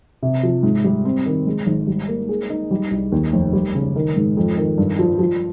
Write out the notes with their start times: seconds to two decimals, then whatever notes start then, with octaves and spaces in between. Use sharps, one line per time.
0.23 C3
0.43 F3
0.63 G#2
0.84 G3
1.05 C4
1.26 D#3
1.47 G#3
1.66 G#1
1.87 G3
2.08 A#3
2.29 G#4
2.50 D#4
2.71 G3
2.91 C2
3.12 D#2
3.33 F1
3.53 G3
3.75 C#3
3.96 D#3
4.16 G#2
4.37 F2
4.57 D#3
4.78 G2
4.99 F3
5.19 F3